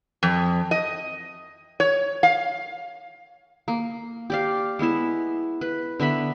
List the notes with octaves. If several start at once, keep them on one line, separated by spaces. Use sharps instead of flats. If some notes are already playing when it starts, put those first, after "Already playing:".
F2
D#5
C#5
F5
A#3
G4 D5 F5
G#3 B3 E4 E5
B4
D3 B3 E5 B5